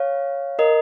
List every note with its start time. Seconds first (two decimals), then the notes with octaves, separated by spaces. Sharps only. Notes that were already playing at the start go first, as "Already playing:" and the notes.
Already playing: C#5 F5
0.59 A#4 D#5